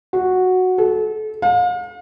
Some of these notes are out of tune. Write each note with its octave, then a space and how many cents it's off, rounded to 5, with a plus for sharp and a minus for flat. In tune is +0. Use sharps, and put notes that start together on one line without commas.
F#4 -5
A4 -30
F5 +40